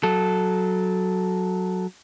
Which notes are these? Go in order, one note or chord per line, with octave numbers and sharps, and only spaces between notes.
F#3 A4